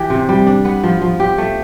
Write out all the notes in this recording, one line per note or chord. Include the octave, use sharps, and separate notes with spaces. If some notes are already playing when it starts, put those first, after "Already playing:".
Already playing: E3 G4
C3
G3
D4
B3
F3
F3
G4
A3